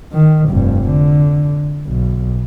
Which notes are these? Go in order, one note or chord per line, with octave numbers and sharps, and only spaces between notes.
D#3
F1 G2
D3
B1